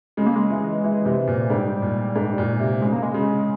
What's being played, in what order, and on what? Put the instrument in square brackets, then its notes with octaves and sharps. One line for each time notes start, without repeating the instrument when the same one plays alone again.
[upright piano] C#3 [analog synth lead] G#3
[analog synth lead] A#3
G#3
[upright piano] E3
E3
C3
A#2
[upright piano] G#2 [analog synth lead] G3
[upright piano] A#2
G#2
A#2
C3
[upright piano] C#3 [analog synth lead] G#3
[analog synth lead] A#3
G#3
[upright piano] C#3